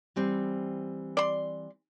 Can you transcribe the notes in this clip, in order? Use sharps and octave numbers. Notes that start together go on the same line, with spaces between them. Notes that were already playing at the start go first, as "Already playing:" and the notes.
E3 G3 C4
D5 C6